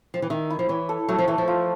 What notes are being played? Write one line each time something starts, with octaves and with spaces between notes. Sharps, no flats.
F3
E3
D#3 E5
E4
F3
E3 C#5
A4
F#3 A3
F3
E3 A3
F3
F4